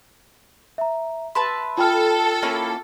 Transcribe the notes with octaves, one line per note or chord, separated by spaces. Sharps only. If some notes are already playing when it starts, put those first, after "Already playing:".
E5 A#5
B4 E5 A5 C6
F4 A4 G5 F6
A#3 C#4 E4